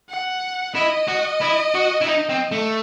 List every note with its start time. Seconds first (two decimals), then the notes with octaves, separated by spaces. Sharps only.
0.09 F#5
0.75 E4 D#5
1.08 F#4
1.41 E4
1.75 F#4
2.01 E4
2.07 D#4
2.29 C4
2.51 A3